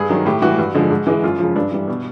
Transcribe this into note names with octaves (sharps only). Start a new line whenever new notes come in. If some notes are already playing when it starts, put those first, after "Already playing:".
Already playing: G2 G#4
D#3 F#3
A2 G4
E3 G3 F#4
G2
D3 F3 G#3
G#2
E3 G#3
F#2 F4
C#3 F3
G2 D4
E3 G3
B2